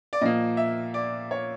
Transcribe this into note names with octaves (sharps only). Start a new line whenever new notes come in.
D5
A#2 F3 A#3 D#5
E5
D5
C#5